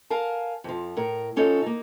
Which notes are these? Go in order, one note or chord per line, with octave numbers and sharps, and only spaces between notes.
A#4 F5 G#5 A5
F2 F3
A2 A#4
F3 C#4 D#4 A4 C#5
A#3 D#4